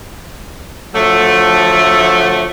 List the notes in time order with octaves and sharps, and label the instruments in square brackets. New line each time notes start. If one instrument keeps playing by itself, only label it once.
[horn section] D3 F3 F#3 A3